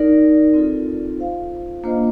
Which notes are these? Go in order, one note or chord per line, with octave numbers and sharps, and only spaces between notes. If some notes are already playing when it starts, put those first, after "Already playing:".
Already playing: D#4 A#4 D5
C4 F4 A4
F4 C5 F5
A#3 D4 F4 C5 D#5